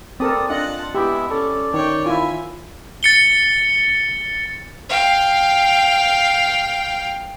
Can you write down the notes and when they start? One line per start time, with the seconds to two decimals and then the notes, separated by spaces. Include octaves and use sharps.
0.20 C4 A4 A#4 D5 D#6
0.50 D4 F4 D#5 F#5 A5 F#6
0.95 G#3 B3 E4 G4 E5
1.31 C#4 A4 D5
1.74 D#3 C#5 G5
2.06 E4 F4 E5 G#5
3.03 A6 C#7 G7
4.89 F5 G5